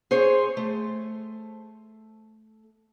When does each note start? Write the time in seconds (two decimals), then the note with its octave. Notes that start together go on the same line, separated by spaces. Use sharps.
0.11 G#4 C5 C#5
0.57 A3